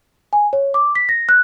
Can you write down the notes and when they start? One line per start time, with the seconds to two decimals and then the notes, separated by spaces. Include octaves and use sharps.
0.33 G#5
0.53 C#5
0.74 D6
0.95 B6
1.09 A#6
1.29 F#6